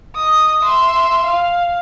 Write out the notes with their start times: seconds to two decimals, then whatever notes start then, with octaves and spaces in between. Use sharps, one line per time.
0.15 D#5 D#6
0.63 E5 C6
1.24 F5